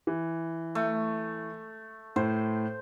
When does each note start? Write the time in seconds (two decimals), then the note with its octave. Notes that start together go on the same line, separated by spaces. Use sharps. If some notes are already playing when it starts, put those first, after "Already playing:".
0.07 E3
0.75 A3
2.16 A2 C5